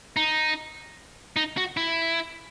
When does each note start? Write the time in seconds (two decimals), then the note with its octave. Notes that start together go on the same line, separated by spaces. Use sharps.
0.17 D#4
1.36 D#4
1.57 F#4
1.77 E4